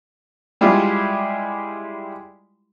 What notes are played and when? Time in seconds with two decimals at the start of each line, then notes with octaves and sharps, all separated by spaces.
0.61 G3 G#3 E4 F4 G4